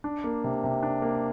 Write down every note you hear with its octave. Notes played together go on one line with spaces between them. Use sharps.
D4
A#3
C3
C3
D4
A#3